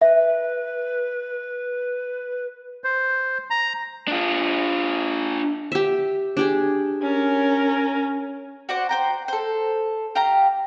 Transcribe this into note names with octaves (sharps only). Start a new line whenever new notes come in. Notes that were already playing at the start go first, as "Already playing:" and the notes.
B4 E5
C5
A#5
D4 F4
G4 E5
D4 G4 G#4
C#4 A#4
F#4 C5 D5 F#5
C5 G5 A#5
A4 C5
G4 F5 A#5